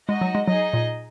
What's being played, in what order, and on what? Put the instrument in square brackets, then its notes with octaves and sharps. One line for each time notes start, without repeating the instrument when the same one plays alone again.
[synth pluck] G#3 [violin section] D#4 F#4 D#5
[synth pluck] F#3
G#3
[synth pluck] F#3 [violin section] D#4 G#4 D#5
[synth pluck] A#2